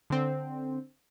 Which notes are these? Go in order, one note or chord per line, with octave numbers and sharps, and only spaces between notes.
D3 C4